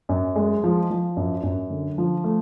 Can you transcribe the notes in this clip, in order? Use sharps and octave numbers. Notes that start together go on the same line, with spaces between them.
F#2
G#3
F3
F3
F#2
F#2
D3
F3
A3